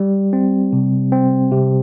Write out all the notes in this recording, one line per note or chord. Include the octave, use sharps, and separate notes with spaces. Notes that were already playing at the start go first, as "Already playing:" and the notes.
Already playing: G3
C4
C3
C4
C3